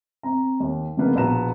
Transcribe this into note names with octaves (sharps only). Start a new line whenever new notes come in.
C4 A#5
D#2
F2 C#3 F3 A#3 B3
A#1 B2 B3 A#5 E7